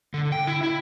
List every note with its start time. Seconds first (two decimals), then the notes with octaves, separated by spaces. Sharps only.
0.14 D3
0.32 G5
0.47 E4
0.63 E4